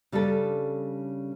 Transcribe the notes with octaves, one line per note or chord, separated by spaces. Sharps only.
C#3 G3 D4 A4